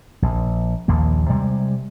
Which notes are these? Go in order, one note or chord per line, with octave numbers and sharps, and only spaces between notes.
A#1
A#1 D#2 F3 A#3
C3 G3 G#3